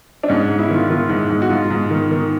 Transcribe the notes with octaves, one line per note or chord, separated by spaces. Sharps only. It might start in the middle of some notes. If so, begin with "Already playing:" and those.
D4
G#2 C#4
G#2
E4
D#3 F4
D#3 F4
G#2
G#2
F#4
G#2 F4
G#2
D#3
D#3